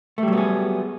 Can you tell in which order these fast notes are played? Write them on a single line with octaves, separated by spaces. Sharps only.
A3 G3 F#3 B3 G#4